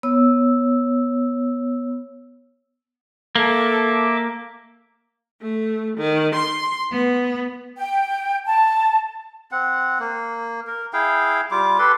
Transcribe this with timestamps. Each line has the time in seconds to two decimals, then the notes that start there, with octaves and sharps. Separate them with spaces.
0.03 B3 C#5 E6
3.36 A#3 A4 E5 D6
5.41 A3
5.97 D#3
6.35 C6
6.93 B3
7.78 G5
8.46 A5
9.52 C4 F#5
10.00 A#3
10.67 A#4
10.93 E4 G#4 F5 G5
11.51 G3 F4 D6
11.79 G4 A4 B4 C6